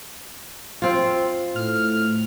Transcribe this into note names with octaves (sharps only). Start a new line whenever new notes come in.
C4 F4
A2 F6